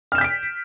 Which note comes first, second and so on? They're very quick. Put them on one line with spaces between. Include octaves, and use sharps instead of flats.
F6 E7 G6 B6 D7